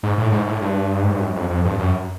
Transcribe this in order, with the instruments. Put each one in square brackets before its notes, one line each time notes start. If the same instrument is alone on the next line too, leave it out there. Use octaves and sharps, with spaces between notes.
[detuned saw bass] G#2
A2
G#2
A2
G2
G#2
G2
F#2
F2
F2
G2
F#2